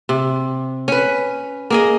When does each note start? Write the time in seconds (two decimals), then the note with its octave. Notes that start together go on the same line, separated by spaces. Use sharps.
0.09 C3
0.88 C#4 B4
1.70 A#3 G#4 D#5